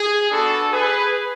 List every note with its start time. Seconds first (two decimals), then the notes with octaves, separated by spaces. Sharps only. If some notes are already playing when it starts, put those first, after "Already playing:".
Already playing: G#4
0.31 B3 D4 F#4 A4
0.72 G#4 B4